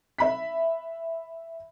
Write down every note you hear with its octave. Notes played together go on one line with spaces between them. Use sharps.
E5 B5 B6